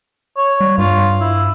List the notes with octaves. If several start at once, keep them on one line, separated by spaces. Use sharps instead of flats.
C#5
G3
G2 F4
E4